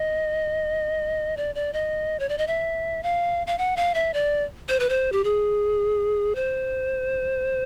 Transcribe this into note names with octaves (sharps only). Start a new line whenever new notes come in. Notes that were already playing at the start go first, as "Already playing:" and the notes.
Already playing: D#5
D5
D5
D#5
C#5
D5
D#5
E5
F5
F5
F#5
F5
E5
D5
C5
B4
C5
G4
G#4
C5